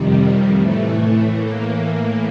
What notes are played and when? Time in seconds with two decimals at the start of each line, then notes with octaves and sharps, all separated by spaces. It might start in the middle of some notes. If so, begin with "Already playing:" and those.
Already playing: F2 C3 D#3 G3
0.48 A2 E3 A3
1.25 A2 E3 A#3